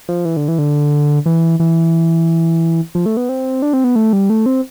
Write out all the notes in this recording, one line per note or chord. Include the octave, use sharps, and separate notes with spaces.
F3
E3
D3
E3
D3
E3
E3
F3
A3
B3
C4
D4
C4
B3
A3
G3
A3
C4